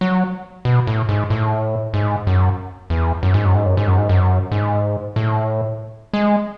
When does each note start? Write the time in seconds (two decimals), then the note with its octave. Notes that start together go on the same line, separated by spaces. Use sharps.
0.01 F#3
0.65 B2
0.87 A2
1.09 G#2
1.30 A2
1.94 G#2
2.27 F#2
2.90 E2
3.23 F#2
3.34 G#2
3.45 F#2
3.55 G#2
3.65 F#2
3.77 G#2
3.88 F#2
3.98 G#2
4.09 F#2
4.52 G#2
5.16 A2
6.13 G#3